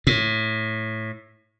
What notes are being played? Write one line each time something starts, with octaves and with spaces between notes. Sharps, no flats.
A2